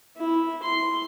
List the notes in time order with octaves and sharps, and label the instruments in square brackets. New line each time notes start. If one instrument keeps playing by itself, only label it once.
[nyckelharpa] E4
C6